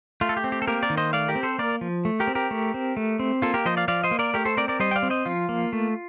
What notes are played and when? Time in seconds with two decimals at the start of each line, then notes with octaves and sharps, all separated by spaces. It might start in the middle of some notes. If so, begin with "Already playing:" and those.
0.21 A3 F4
0.29 A4
0.37 G4
0.44 C4
0.52 G4
0.62 A4
0.67 A#3 G4 A#4
0.83 A#4 D5
0.90 D#3
0.97 C5 D#5
1.13 A3 D5 F5
1.28 G4 A#4
1.35 C4
1.43 A4 C5
1.58 A#3 A#4 D5
1.81 F3
2.05 A3
2.20 G4 A#4
2.27 C4
2.35 G4 A#4
2.51 A3
2.74 C4
2.97 A3
3.19 C4
3.42 A#3 F4 A4
3.54 G4 A#4
3.65 F3 C5 D#5
3.77 D5 F5
3.88 F3 D5 F5
4.04 C5 D#5
4.11 A#3
4.19 A#4 D5
4.34 A3 G4 A#4
4.45 A4 C5
4.57 C4 A#4 D5
4.68 A#4 D5
4.80 G3 C5 D#5
4.91 G5
4.96 D5 F5
5.03 C4
5.10 C5 D#5
5.26 F3 F4
5.49 A#3
5.73 A3